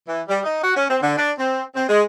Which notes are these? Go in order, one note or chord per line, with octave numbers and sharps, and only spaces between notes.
E3
G3
D#4
F#4
C#4
C4
D3
D4
C4
C4
G#3